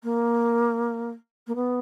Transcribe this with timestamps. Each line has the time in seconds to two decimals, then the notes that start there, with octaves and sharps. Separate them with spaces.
0.03 A#3
1.47 A#3
1.55 B3